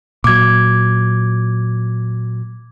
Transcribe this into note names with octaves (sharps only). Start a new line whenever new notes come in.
A#2 F#3 D6 G#6